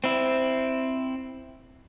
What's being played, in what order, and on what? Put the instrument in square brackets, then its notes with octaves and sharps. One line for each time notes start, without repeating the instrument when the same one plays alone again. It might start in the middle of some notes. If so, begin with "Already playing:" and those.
[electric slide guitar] C4 E4